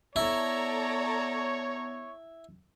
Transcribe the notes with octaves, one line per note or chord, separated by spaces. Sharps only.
B3 E4 A4 C#5 D5 A#5